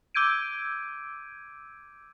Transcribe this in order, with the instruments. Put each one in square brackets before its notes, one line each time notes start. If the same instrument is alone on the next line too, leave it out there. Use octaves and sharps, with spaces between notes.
[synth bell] D6 E6 G6 G#6 D7 D#7